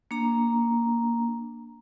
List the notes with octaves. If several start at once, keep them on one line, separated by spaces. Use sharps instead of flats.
A#3 D4 A#5